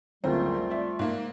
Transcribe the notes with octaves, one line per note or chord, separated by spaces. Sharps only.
F#1 D2 A#2 G3 A3 C4 F4
D5 E5
G#2 A#3